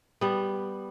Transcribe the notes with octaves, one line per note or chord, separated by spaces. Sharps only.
G3 B3